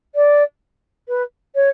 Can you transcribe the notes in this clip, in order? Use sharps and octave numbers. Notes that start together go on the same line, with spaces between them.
D5
B4
C#5